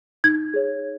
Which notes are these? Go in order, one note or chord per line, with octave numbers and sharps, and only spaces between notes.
D#4 G#6
G#4 C#5